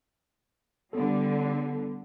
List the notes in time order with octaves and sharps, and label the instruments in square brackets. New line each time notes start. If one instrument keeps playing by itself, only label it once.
[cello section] D3 G3 [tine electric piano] B3 A4